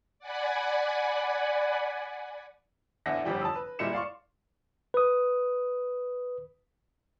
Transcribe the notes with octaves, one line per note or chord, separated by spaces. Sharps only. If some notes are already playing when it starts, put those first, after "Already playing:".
D5 F#5 G#5 B5
E2 A2 D4 E5 F#5 A#6
G1 E2 F3 G3 G4 G5
A5 D#6 E6
B4
A#2 G3 G#3 E4 C#7 E7
D5 F5 C6 C#6
B4 D#6